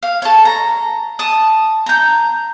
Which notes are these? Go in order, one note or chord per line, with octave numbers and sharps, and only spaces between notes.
F5
A4 C#5
A#5
A5 D#6
A#5 G6